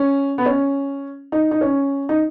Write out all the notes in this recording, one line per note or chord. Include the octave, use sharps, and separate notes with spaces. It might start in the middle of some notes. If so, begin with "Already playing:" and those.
Already playing: C#4
B3
C#4
D#4
D#4
C#4
D#4